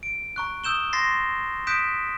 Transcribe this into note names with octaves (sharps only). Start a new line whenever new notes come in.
D7
A#5 C#6 F#6
D#6 E6 G6 E7 G7
C6 A6 A#6 C7
D#6 F#6 G6 B6 D7 E7